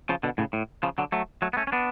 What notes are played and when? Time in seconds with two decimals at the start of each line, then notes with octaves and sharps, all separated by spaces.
0.09 C#3 F3
0.23 B2 D3
0.38 A2 C#3
0.53 A2
0.83 C#3 F3
0.98 D3 F#3
1.12 F#3 A3
1.42 F#3 A3
1.53 B3
1.57 A3 C#4
1.67 C#4
1.72 B3 D4